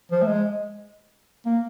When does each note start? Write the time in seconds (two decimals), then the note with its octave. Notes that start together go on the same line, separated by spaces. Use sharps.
0.12 F3
0.22 A3
0.27 G#3
1.46 A#3